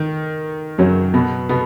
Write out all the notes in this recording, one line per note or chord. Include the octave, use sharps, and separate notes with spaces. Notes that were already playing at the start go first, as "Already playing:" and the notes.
Already playing: D#3
F#2 F#3
B2 B3
B2 B3